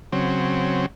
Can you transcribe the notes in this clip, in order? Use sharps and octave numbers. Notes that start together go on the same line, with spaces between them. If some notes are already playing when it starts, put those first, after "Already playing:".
C#3 F#3 C4